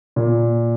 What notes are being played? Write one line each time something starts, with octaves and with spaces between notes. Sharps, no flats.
A#2